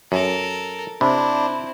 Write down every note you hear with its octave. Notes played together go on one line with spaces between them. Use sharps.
F#2 A4 A#4
C3 C4 D4 E4 B5